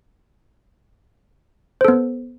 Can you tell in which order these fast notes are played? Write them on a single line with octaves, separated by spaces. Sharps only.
C5 A4 B3